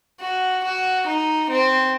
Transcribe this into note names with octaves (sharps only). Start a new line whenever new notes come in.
F#4
F#4
D#4
C4